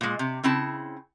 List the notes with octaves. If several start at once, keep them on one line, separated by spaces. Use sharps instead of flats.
A#2 G#3
C3
C#3 C4 E4 A5